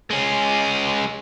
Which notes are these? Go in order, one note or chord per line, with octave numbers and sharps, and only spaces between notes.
G#3 C#4